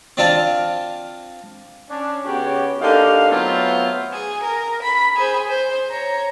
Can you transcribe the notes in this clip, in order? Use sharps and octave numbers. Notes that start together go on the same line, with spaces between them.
C4 D4 F4 F5 A5
C#4 D4
C#3 B3 C#4 F#4 G4 C#5
D3 A#3 D#4 G4 F5
F#3 A3 B3 C4 F4
G#4
A#4
B5
G#4 C5
C5
C#5 A#5